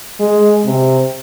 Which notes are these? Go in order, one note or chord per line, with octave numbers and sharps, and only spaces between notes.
G#3
C3